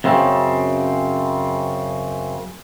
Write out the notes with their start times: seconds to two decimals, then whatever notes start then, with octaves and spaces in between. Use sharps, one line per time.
0.04 F#2 C#3 C4